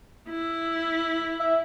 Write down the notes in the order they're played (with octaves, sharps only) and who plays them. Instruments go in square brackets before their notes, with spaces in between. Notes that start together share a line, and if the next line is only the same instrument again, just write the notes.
[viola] E4
[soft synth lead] E5